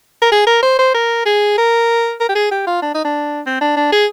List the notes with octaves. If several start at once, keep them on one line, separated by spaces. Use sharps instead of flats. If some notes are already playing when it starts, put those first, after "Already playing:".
A#4
G#4
A#4
C5
C5
A#4
G#4
A#4
A#4
G4
G#4
G4
F4
D4
D#4
D4
C4
D4
D4
G#4